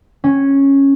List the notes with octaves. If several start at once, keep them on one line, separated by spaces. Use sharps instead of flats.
C#4